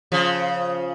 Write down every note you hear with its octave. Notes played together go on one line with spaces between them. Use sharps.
C#3 F3